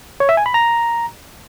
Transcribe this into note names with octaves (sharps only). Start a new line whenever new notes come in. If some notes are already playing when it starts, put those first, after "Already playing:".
C#5
E5
G#5
B5
A#5